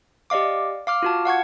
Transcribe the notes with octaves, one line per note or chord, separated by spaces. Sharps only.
G4 D5 D#5 F5 D6
F5 D6 F6
F4 F#4 A5
F5 F#5 C#6 G#6